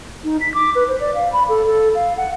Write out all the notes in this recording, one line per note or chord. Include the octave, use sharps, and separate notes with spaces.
D#4
B6
D6
B4
C5
D5
F5
B5
A4
A4
F5
F#5